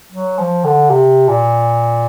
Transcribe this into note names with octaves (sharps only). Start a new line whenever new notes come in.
F#3
F3
D3
C3
A#2